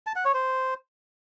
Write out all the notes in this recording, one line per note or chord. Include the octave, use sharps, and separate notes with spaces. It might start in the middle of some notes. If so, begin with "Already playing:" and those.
A5
F#5
C#5
C5